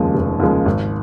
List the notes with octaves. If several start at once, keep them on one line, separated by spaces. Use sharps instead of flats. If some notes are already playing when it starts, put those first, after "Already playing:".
Already playing: F1 D#2 C#3 F3 G#3
F1
D#2 C#3 F3 G#3
G#1